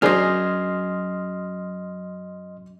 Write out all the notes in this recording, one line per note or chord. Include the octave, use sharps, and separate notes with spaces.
C#2 F#2 D4 G#4 C5 D#5 C6 F6